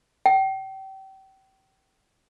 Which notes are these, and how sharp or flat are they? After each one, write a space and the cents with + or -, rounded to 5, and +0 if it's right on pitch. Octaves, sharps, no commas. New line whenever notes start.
G5 -35